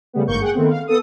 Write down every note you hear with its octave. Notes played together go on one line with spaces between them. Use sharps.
C#3 G3 A3 B3
G1 G#2 A#3 C#6 G6
G#4 F#5 G5
D#3 A3 B3 C4
F5
B3 A4 D#6